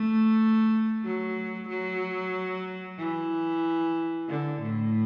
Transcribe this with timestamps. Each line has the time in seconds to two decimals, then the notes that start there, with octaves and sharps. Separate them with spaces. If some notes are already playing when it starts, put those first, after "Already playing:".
Already playing: A3
1.04 F#3
1.69 F#3
2.99 E3
4.29 D3
4.62 A2